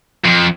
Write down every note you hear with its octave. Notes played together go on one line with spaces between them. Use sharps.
F2